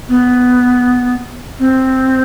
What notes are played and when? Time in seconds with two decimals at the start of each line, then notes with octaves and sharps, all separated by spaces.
0.09 B3
1.60 C4